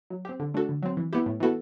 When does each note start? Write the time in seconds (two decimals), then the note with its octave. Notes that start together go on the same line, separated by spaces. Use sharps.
0.10 F#3
0.25 C4 G4
0.40 D3
0.54 A3 D4 F#4 A4
0.69 D3
0.83 F#3 C4
0.97 E3
1.13 B3 E4 G4
1.26 A2
1.40 E3 B3 F#4 A4